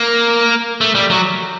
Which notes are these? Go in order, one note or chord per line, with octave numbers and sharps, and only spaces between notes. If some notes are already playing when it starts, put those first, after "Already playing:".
Already playing: A#3
A3
G3
F#3